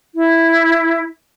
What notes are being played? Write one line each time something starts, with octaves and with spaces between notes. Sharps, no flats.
E4